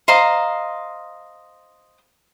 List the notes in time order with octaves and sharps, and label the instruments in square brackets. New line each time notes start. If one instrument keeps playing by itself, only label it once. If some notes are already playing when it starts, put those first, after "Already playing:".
[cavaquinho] C5 D#5 F5 A#5